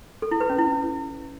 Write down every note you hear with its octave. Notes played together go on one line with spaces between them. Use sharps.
A4
E4
B4
C#4
E4